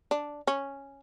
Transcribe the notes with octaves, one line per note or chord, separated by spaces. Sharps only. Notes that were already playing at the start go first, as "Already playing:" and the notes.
D4
C#4